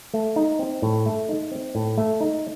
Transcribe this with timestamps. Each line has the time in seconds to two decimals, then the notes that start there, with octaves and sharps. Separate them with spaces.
0.14 A3
0.36 D#4
0.59 C4
0.82 A2
1.06 A3
1.29 D#4
1.51 C4
1.75 A2
1.98 A3
2.20 D#4